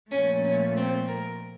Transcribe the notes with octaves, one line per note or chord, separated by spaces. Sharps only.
A#2 F3 A3 C#4
C#4
C4
A#4